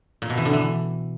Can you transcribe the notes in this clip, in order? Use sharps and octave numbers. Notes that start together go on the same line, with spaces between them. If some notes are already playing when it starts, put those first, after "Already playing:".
A#2
B2
E3
D3
E3